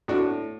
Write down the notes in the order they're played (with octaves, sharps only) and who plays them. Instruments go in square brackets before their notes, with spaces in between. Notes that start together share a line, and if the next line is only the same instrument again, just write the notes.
[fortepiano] A2 D4 F#4